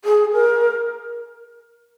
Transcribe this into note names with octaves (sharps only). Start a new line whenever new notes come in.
G#4
A#4